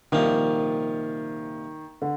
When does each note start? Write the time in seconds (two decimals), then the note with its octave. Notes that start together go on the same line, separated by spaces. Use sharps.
0.12 C2 A#2 D#3 F3 A#3
2.02 D3